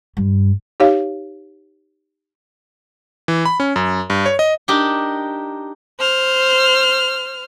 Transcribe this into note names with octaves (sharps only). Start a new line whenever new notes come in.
G2
D#4 G4 C#5 F5
E3
B5
C#4
F#2
G2
C#5
D#5
D4 D#4 G4 A#4
C5 F6